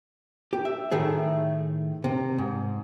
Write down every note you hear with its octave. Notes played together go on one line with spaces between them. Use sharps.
G4
E5
A2 D#3 A3 G#4
C3
G#2